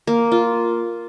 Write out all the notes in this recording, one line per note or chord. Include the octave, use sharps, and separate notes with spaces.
A#3
F4